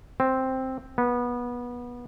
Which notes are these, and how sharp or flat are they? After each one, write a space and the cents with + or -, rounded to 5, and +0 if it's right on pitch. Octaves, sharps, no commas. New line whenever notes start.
C4 +5
B3 -20